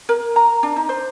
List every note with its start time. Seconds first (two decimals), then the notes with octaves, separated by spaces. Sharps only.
0.09 A#4
0.36 A#5
0.63 D4
0.76 D#4
0.89 C5